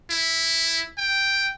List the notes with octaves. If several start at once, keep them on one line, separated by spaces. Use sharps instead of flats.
E4
G5